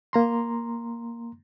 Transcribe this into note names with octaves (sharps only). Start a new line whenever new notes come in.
A#3 A#5 C6